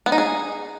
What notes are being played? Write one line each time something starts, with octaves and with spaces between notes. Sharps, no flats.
B3
D#4
G#4